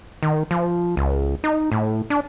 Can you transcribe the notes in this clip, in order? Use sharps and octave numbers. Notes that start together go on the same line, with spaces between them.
D#3
F3
C#2
D#4
A2
D4